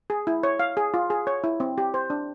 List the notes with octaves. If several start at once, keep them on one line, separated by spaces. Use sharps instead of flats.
G#4
E4
C#5
F5
G#4
F4
G#4
C#5
E4
C4
G4
C5
D4